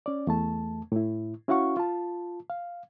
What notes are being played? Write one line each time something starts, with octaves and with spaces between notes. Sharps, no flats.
C#4 D5
E2 A3 A5
A2 E4
C#4 E4 F#4 F5 F#5 C#6
F4 A5
F5